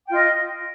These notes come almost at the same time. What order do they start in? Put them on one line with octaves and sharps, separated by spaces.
G5 F4 D#5